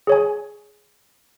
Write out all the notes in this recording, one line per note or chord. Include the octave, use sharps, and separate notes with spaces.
G#4 C#5 G#5